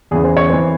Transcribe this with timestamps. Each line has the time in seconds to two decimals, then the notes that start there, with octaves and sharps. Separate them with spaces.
0.11 E2 C#3 E3 G#4
0.24 C5
0.37 C#5
0.49 F2 E3 C5